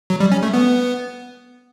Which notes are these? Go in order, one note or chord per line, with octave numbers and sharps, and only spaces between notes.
F#3
G3
C#4
A3
B3